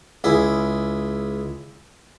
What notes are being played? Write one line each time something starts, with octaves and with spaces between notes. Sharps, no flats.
C#2 E4 G#4